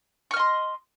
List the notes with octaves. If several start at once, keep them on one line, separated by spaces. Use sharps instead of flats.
D#5 C6 C#6 F6